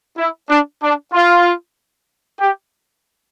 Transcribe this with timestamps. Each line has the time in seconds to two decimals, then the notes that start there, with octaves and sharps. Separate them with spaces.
0.18 E4
0.49 D4
0.82 D4
1.13 F4
2.40 G4